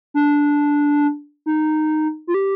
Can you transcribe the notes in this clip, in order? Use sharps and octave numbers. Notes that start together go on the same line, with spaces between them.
D4
D#4
F4
G4